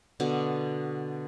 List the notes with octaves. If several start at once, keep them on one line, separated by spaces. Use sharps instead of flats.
B2 D3 D6